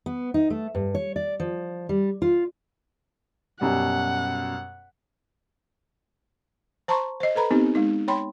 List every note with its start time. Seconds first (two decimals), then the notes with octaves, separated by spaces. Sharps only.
0.06 B3
0.34 D#4
0.50 A3
0.75 G2
0.95 C#5
1.16 D5
1.40 F3
1.89 G3
2.22 F4
3.61 F#2 B2 G3 F#5
6.88 C5 A5 A#5 C6 C#6
7.20 C5 D#5
7.35 A4 B4 A#5 B5
7.51 B3 C4 D#4 G4
7.75 G#3 D#4
8.08 C#5 G5 B5 C6